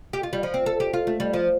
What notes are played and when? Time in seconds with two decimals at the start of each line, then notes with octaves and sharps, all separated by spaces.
0.13 G4
0.23 F4
0.33 G3
0.43 F3
0.54 C4
0.66 A4
0.80 G4
0.93 F4
1.07 A3
1.20 G3
1.33 F3